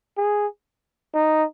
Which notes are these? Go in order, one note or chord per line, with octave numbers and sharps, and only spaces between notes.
G#4
D#4